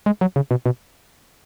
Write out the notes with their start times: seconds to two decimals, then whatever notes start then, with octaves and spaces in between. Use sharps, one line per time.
0.06 G#3
0.21 F#3
0.36 C#3
0.51 B2
0.66 B2